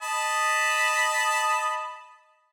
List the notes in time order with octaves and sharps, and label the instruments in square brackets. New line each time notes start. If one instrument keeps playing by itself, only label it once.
[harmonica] D#5 A5 B5